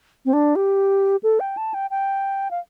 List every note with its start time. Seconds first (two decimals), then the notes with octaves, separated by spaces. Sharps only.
0.25 C4
0.33 D4
0.56 G4
1.23 A4
1.40 G5
1.57 A5
1.74 G5
1.90 G5
2.51 F5